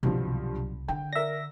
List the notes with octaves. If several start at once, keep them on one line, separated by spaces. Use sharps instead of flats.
C2 G2 B2 D3 F3 F#3
D3 G5
A#4 D5 E5 A#6